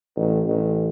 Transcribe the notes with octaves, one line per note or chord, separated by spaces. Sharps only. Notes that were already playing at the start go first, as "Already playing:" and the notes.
A1
A1